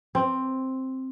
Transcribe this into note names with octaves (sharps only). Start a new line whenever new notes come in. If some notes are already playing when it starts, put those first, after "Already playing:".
C4